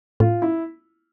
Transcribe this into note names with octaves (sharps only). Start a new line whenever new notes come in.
A2 F4
E4